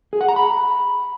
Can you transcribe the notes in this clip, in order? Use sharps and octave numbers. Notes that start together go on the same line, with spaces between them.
G#4
F#5
A#5
B5